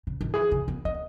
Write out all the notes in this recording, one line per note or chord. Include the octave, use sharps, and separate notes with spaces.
C#3
D#3
E3 G#4
C#3
B3
B3 D#5